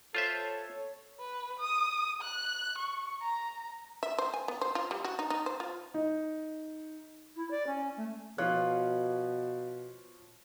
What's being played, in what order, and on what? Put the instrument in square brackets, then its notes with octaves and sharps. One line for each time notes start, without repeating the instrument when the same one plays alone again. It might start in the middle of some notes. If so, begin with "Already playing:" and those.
[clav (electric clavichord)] F4 C5 E5 [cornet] A4 [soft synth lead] C#5
[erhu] B4
D#6
F#6
C#6
A#5
[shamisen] E5
C5
G#5
B3
C5
F4
G3
F#4
D#4
D#4
C5
F4
[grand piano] D#4
[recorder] E4
D5
C#4
A3
[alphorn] B2 [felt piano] F3 C#5 F#6 [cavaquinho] F4